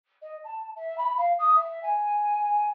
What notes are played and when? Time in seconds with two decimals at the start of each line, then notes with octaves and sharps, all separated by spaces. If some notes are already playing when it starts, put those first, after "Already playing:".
0.21 D#5
0.44 A5
0.75 E5
0.97 B5
1.17 F5
1.38 D#6
1.55 E5
1.82 G#5